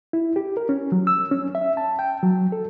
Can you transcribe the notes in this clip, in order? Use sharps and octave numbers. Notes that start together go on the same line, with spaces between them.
E4
G4
A#4
C#4
F#3
E6
C#4
E5
A5
G5
F#3
A4